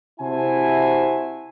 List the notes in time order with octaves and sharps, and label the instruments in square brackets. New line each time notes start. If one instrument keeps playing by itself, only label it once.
[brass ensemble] C3 E4 F#4 C5 G#5 A5